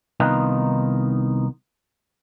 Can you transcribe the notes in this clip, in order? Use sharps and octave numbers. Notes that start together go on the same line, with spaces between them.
C2 D#3 B3 D#4 F4